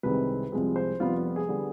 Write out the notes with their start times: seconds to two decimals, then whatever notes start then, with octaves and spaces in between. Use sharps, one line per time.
0.03 C2 C3 D#3 G#3 C4 B4
0.52 C2 C3 F3 G#3 C4
0.76 C5
1.00 F1 F2 C3 G3 B3 F4
1.36 G#4
1.48 D3 G3 B3